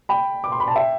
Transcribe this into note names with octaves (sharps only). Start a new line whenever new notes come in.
G5 B5
D6
C6
B5
A5
E5 G5